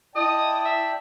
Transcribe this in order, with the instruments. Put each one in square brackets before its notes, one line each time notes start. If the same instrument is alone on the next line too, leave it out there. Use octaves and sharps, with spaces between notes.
[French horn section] E4 [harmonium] D5 G5 A5 [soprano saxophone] D#5 [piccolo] D#6
[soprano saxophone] E5